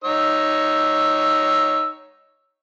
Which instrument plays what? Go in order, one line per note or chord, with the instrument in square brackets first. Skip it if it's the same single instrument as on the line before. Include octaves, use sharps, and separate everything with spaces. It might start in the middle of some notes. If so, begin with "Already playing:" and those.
[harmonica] D#4 C#5 E6